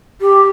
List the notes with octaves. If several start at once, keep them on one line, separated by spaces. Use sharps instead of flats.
G4